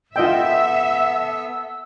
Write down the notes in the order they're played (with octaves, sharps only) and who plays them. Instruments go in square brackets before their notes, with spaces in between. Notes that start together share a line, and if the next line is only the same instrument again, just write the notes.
[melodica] B3 A4 [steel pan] F4 D#5 G5 [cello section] E5 [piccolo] E6